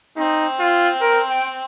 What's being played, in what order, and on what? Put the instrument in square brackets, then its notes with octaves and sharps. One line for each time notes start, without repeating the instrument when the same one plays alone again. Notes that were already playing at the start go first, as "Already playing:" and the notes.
[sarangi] C4 [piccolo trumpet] D#4
[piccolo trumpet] F4
A#4
G5